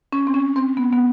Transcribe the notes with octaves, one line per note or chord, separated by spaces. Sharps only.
C#4
C4
C#4
C4
B3
B3